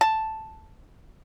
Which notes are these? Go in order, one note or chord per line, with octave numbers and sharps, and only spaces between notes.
A5